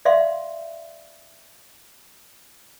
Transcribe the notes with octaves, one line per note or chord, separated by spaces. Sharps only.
D5 E5 F5 C6